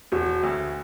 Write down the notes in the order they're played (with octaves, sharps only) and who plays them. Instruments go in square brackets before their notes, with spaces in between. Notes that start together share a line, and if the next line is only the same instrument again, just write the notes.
[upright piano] E1 [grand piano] F#4
[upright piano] D2